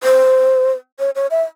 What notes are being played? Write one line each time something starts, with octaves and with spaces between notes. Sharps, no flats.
C5
C#5
C#5
E5